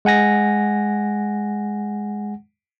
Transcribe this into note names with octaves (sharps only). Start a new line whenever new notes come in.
G#3 F#5 G#5 A#6